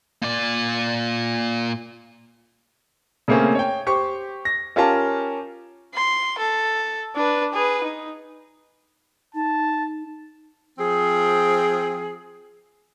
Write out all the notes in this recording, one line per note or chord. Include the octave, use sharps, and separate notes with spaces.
A#2 D5
C#3 A3 A#3 C4 C#4
C#5 G5
G4 C5 C#6
A#6
C#4 F4 G4 A#4 A5
C6
A4
D4 B4
G#4 B4
D#4
D#4 A5
F3 C4 G#4